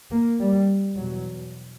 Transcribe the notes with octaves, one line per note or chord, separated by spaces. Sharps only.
A#3
G3
E2 B2 F#3